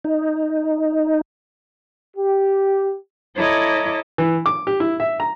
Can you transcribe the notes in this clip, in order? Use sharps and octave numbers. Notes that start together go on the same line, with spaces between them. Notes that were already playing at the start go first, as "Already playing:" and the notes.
D#4
G4
E4 A4 C#5 D#5 A#5 D6
E3
D6
G4
E4
E5
A#5